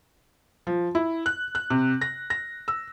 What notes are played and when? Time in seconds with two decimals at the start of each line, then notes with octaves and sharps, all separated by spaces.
0.67 F3
0.95 E4
1.26 F#6
1.55 F#6
1.70 C3
2.01 A#6
2.30 A#6
2.68 E6